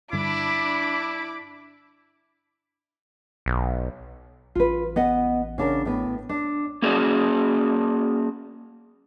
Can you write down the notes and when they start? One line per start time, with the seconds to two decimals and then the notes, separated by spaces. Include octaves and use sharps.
0.13 G2 D3 G3 D4 E4 B5 D6
3.46 B1
4.55 A1 F4 B4
4.96 B3 D#5 F#5
5.58 C#3 D4 A#4
5.85 A2 B3
6.29 D4
6.82 A#3 C#4 F#4 G#4 D5